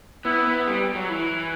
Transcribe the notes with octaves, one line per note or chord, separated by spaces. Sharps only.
B3 E4
B3
G3
F#3
E3